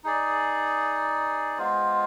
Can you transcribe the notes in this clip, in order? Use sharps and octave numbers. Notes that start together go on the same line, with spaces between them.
D#4 G#4 D5
G#3 B3 F4 C5